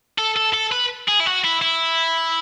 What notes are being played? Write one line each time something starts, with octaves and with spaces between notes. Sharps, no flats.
A4
A4
A4
B4
G#4
E4
F#4
E4
E4